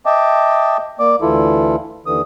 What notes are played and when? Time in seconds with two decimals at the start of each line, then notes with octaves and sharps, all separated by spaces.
0.06 D#5 E5 G5 A5 D6
0.99 A#3 D5 D6
1.21 D2 E3 E4 F4 A4
2.06 D#2 D3 E3 D#6